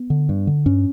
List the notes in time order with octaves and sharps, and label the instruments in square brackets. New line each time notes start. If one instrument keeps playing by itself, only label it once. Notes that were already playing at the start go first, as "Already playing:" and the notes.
Already playing: [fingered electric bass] B3
D3
G2
D3
G2 C#4